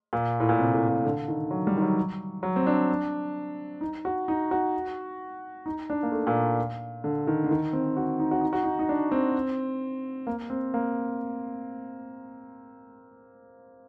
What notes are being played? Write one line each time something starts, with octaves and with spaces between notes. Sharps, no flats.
A#2
A2
A#2
C3
A2
A#2
D3
D#3
F#3
G3
D#3
F#3
F#3
C4
D4
D#4
F#4
D#4
F#4
D#4
D4
A#3
A3
A#2
D3
D#3
D3
D#3
C4
F#4
D#4
F#4
D#4
F#4
D#4
D#4
D4
C4
A#3
C4
A#3